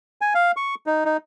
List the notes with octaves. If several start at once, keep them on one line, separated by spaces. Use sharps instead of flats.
G#5
F5
C#6
D#4
D#4